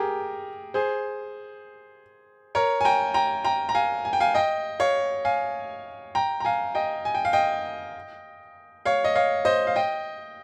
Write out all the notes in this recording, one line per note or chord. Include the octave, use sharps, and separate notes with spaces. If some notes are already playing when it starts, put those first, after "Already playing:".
Already playing: G4 G#4 A#4
G#4 C5
A#4 C#5
G#5
G5 A#5
G5 A#5
G5 A#5
A#5
F5 G#5
G#5
G5
F5 G#5
D#5 G5
C#5 F5
F5 G#5
G5 A#5
A#5
F5 G#5
D#5 G5
G#5
G5
F5
D#5 G5
C#5 F5
D#5
C#5 F5
C5 D#5
F5
D#5 G5